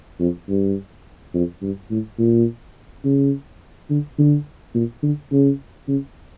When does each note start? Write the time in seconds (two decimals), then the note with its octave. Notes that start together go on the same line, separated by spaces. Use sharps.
0.20 F2
0.49 G2
1.34 F2
1.62 G2
1.91 A2
2.19 A#2
3.05 C#3
3.90 D3
4.18 D3
4.74 A#2
5.03 D3
5.32 C#3
5.88 C#3